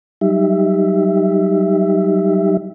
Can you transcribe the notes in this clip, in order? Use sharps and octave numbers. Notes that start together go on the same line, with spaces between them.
F#3 G3 D#4 G4 E5